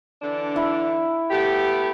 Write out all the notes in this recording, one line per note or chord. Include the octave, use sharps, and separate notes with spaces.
D3 E3 D4
E4
A3 B3 G4